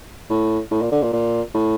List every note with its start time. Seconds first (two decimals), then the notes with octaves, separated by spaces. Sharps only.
0.30 A2
0.71 A2
0.82 A#2
0.92 D3
1.03 A#2
1.13 A#2
1.54 A2